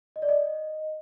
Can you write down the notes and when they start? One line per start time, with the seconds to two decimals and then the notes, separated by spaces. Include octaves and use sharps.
0.16 D#5
0.22 D5
0.29 D#5